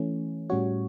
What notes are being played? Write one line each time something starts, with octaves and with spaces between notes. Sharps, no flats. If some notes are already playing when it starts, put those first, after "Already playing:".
Already playing: E3 A3 C#4
A2 G3 C#4 F#4 C#5